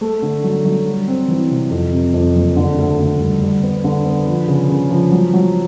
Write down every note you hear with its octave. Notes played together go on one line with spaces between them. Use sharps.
A3
D3
F#3
F#3
G3
C4
E3
C3
F2
C3
F2
F#1
D3
D2
D3
G3
G3
B3
D3
B3
F3
C#3
C#3
F3
F#3
F#3